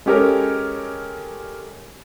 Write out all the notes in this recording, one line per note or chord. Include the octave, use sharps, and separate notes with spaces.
G#3 C#4 G4 A4 A#4 C#5